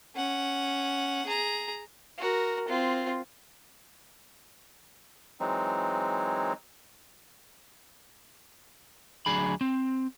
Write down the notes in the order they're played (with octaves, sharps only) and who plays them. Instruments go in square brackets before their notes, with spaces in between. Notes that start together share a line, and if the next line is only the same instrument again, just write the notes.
[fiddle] C#4 F#5
G#4 A#5
[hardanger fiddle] F#4 A#4
C4 F4
[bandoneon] E3 F#3 G#3 C4 D#4
[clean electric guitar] D2 F#3 D4 G#4 B5
C4